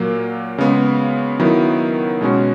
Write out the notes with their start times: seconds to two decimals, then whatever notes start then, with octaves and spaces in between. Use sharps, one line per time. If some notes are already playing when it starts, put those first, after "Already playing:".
Already playing: A#2 F#3 A#3
0.58 C#3 G#3 B3
1.40 D#3 F#3 B3 E4
2.21 B2 G#3 C#4 F#4